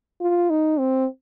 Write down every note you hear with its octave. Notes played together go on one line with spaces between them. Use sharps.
F4
D#4
C4